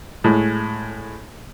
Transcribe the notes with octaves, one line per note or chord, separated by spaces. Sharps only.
A2 G#3